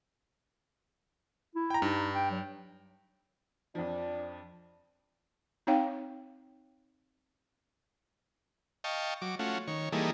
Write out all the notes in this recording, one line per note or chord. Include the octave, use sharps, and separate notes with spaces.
E4
G5 A#5
G2 D#4
G5
F#3
F2 F3 D4
C4 D#4 C#5 F5 G5
D#5 F5 G5 A5 C#6
F#3 D6
A3 C#4 F4 F#4
D#3 C#5
E3 G3 A#3 D#4 G#4 A4